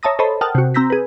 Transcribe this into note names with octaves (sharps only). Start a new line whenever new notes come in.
C#5 E5 A5 A#5 D#6 A#6
A4 C5 C#5 D#5 A5 B5
A#4 F#5 G5 A5 D#6 F6
C3 F#4
C4 A#5 E6 G6 A#6 B6
G#4 B4